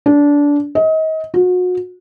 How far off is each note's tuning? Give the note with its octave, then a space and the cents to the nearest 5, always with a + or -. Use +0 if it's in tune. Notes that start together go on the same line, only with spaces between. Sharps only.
D4 -20
D#5 +30
F#4 -35